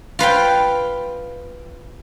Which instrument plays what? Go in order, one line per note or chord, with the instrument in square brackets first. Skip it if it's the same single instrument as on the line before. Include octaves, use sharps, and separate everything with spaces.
[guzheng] F4 B4 F5 G5